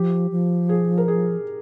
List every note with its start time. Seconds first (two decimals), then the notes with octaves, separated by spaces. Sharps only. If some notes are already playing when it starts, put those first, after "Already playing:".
Already playing: F3 G4
0.31 F3
0.69 G#4
0.98 A#4
1.08 G#4